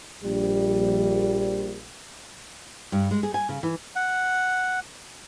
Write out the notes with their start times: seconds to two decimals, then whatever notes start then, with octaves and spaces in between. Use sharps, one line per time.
0.24 A#1 G3
2.92 G2
3.11 G#3
3.23 G#4
3.34 G#5
3.49 C#3
3.63 E3
3.96 F#5